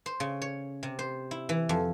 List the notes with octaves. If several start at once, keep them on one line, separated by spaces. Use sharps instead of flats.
C5
C#3
C#5
C3
C5
E4
E3
F2